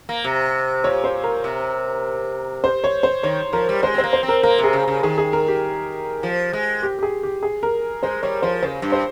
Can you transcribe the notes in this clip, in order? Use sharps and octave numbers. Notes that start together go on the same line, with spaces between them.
A#3
C3
A#2 C#5
C5
A#4
C3
C5
C#5
C5
D#3 C#5
F3 A#4
G3
G#3 C5
C4
C5
A#3
C5
C4
A#4
A#3 A#4
C3
G#4
C#3
C#3
D#3 G#4
G#4
A#4
G4
F3
G#3
G4
G4
G#4
G4
G#4
A#4
G#3 C5
G3 C#5
F3 C5
C#3 C5
G2
C5